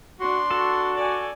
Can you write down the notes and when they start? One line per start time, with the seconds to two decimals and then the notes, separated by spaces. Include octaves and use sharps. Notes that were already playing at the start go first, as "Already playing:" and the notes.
0.20 D4 F#4 C6
0.51 F#4 A4
0.95 D5 G#5